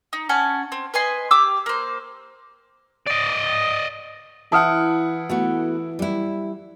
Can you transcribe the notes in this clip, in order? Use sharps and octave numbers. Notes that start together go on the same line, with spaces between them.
D#4
C#4 F#5 G#5 A5
C4
B4 D#5 G#5 C6
G4 D6 E6
A#3 C5
D5 D#5
E3 E4 F#5 A5 D#6 F6
A3 B3 F#4
G3 E4